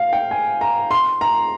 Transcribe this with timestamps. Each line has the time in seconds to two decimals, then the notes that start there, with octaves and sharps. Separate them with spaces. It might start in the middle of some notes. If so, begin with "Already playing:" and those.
Already playing: F5
0.13 G5
0.31 G#5
0.61 A#5
0.91 C6
1.21 A#5